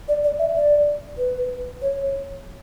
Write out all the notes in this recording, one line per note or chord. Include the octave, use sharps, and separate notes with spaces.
D5
D5
E5
D5
B4
C#5